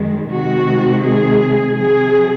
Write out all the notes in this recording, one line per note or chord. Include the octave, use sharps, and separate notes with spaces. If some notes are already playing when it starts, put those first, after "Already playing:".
Already playing: F#2 D#3 G#3
C3 D#3 G#3 F#4
G#4
C3 F#3 G#4